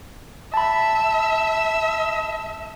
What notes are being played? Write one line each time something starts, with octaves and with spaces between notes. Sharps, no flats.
E5 A5 B5